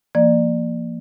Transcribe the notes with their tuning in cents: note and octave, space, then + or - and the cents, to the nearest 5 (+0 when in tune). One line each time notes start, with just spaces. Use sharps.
F3 -35 A#3 +0 D5 +25